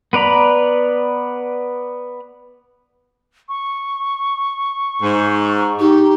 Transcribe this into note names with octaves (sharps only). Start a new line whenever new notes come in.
B3 B4 D5 A#5 B5
C#6
G#2
D#4 G4